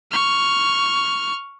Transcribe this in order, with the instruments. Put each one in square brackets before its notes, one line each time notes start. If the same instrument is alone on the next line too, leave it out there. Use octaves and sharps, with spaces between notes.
[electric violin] C#6 F6